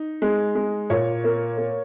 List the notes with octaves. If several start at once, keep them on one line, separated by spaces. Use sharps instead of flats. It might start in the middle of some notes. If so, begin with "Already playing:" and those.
Already playing: D#4
G#3
G#3
A#2 C#5
A#3
A#3